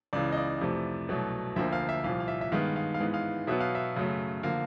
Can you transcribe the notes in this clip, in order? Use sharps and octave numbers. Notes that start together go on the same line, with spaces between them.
C#2 C#3 E3 D5
D#5
D5
F2 C3 E3 A3
C2 B2 F#3 A3
D2 D3 F3 A#3 E5
F5
E5
C2 A#2 F3 F5
F5
E5
E5
G2 D#3 G#3 B3 F5
F5
F5
G#2 E3 G#3 B3
F5
B2 F#3 B3 E5
F5
E5
F#2 C#3 F#3 A3
D3 F3 A#3 F5